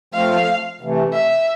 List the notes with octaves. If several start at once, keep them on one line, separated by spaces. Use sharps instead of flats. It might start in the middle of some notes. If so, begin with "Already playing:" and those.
F3 A3 C4 F4 F5
C3 E3 A3
E5